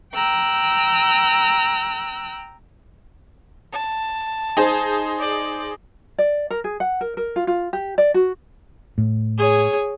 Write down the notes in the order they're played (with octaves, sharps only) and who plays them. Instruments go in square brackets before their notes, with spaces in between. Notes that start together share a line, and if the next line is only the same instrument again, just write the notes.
[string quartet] G5 A#5 E6 F#6
[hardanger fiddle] A5
[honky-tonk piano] D#4 G#4 C5
[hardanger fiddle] D5
[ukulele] D5
A#4
G#4
F#5
A#4
A#4
F4
F4
G4
D5
F#4
[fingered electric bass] A2
[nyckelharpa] G#4 C#5